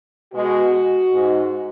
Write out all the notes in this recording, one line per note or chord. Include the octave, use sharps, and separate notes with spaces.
B2 G#3 F#4
G#2 G#3